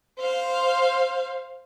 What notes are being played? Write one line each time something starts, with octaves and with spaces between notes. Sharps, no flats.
C5 F5